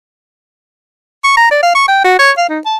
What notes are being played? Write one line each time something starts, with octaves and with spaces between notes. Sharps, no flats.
C#6
A#5
D5
F5
C#6
G5
F#4
C#5
F5
D#4
A5